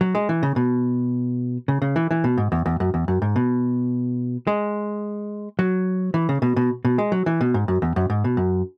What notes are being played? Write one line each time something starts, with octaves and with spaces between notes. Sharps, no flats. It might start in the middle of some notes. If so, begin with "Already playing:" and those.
F#3
G#3
E3
C#3
B2
C#3
C#3
E3
E3
B2
G#2
E2
E2
F#2
E2
F#2
G#2
B2
G#3
F#3
E3
C#3
B2
B2
B2
G#3
F#3
E3
B2
G#2
F#2
E2
F#2
G#2
B2
F#2